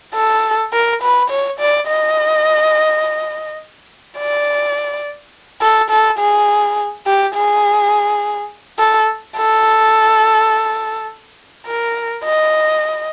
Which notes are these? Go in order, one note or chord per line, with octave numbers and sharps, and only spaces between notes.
A4
A#4
B4
C#5
D5
D#5
D5
A4
A4
G#4
G4
G#4
A4
A4
A#4
D#5